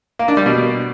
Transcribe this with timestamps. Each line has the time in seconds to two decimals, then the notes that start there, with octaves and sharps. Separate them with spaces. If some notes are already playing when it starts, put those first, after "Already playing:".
0.19 A#3
0.28 D4
0.37 G3
0.46 B2